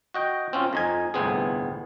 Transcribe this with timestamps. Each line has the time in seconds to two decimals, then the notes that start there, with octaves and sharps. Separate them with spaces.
0.14 F#4 D#5 G5
0.53 C4 C#4 F4
0.73 F2 D#4 G#5
1.14 G1 C2 A2 B3 C4 G#4